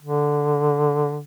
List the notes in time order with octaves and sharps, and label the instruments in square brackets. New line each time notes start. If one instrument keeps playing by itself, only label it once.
[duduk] D3